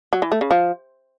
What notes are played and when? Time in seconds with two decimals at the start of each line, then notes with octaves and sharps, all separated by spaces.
0.13 F#3
0.22 E3
0.32 A3
0.41 C#3
0.51 F3